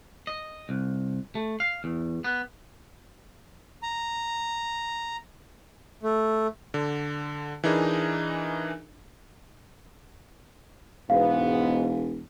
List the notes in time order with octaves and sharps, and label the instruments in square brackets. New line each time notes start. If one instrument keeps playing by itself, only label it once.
[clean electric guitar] D#5
C2
A3
F5
E2
B3
[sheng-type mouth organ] A#5
A3
[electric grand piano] D3
E3 D4 D#4 G#4 A#4
[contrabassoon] E1 [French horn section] G#2 B3 [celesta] F5